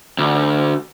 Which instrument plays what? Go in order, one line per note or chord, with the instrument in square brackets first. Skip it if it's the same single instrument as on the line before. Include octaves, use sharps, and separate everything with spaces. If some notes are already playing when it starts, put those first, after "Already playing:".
[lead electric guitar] D2